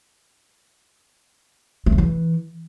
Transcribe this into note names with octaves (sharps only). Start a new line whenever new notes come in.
A3
C#3
E3